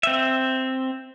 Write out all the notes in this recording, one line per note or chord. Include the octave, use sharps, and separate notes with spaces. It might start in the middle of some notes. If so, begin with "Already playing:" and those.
C4 E5